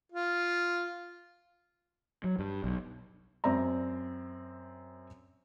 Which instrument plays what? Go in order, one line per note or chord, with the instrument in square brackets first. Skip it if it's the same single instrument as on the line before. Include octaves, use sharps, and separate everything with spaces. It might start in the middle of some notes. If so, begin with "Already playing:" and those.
[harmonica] F4
[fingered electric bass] F#3
G2
B1
[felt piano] F#2 C4 D5 E5 A#5